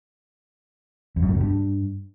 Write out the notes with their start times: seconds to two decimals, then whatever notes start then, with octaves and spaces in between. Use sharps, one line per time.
1.16 F2
1.22 F#2
1.28 A2
1.34 B2
1.41 G2